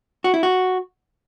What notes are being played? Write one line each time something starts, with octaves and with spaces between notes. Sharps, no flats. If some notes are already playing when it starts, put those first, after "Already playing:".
F#4
E4
F#4